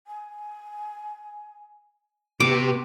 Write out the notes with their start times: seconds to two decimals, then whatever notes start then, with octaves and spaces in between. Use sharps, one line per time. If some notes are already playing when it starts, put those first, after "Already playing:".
0.07 G#5
2.40 C3 B3 F#4 G4 D6